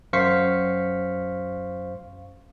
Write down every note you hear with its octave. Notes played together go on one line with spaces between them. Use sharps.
F#2 C5 F5 C#6 B6 C#7